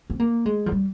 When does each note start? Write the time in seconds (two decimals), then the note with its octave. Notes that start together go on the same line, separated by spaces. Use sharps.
0.10 C4
0.20 A#3
0.46 G#3
0.66 F3
0.72 G3